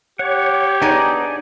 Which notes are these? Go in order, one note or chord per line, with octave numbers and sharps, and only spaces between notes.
G4 C#5 F#5
B3 D4 D#4 G#4 D5 G#5